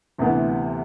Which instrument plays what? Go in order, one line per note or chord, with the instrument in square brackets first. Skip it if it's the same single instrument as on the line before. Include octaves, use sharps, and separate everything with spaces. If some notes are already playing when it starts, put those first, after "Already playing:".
[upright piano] D2 C3 E3 B3